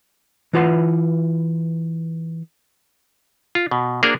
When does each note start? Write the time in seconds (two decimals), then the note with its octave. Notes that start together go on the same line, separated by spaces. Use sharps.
0.53 E3 E4 F4 B4 F#5 C6
3.55 F4
3.71 B2
4.03 A#3 D4 F#4 G#4 A#4 C5